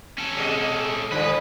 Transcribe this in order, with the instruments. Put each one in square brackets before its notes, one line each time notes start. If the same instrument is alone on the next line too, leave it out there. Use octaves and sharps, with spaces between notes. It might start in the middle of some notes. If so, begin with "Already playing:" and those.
[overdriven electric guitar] C#4 A4
[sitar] B2 G#3 D#5
[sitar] G2 D3 F3 [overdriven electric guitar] B4